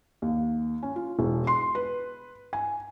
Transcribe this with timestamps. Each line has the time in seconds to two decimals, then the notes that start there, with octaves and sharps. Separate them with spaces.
0.22 D#2
0.83 C#4
0.96 F4
1.19 E1
1.47 C6
1.75 B4
2.53 G#5